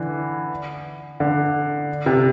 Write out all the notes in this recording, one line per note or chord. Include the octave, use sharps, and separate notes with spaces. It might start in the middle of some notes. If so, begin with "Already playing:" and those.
Already playing: D3 E3
D3
C3